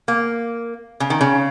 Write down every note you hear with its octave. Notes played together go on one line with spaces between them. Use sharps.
A#3
C#3
D#3
C#3